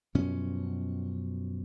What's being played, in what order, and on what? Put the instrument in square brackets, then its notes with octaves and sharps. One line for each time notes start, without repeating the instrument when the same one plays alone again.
[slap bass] F#2 B2 F3 C#4